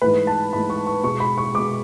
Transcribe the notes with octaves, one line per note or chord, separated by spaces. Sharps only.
G#2 E3 A3 B4
A5
G#2 E3 A3 B5
C#6
C#6
B2 G#3 C#6
B5
C#6
B2 G#3 D6